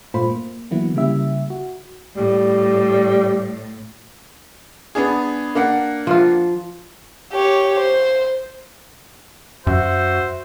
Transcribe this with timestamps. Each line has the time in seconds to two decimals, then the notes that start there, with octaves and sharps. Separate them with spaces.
0.14 G2 A#2 A3 F4 C5 B5
0.30 A#3
0.71 D3 E3 F#3 A#3 B3 E4
0.96 C#3 G3 A#3 E4 G4 E5
1.50 F#4
2.17 A2 G3
4.95 B3 D4 G#4
5.55 A#3 D4 F#5
6.07 F3 F4
7.32 G4 C#5
7.80 C5
9.67 F#2 F#4 C5 E5